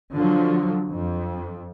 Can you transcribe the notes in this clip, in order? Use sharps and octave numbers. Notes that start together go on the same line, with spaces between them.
D3 F3 F#3
F2